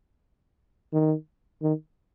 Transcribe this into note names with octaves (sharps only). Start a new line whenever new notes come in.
D#3
D#3